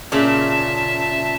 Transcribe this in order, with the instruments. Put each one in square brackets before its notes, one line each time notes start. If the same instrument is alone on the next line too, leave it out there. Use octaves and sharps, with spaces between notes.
[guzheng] A#2 C#3 B5 [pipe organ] E5 A5